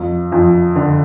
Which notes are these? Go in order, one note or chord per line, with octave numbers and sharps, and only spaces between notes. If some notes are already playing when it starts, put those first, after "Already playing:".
Already playing: F2
F2
D3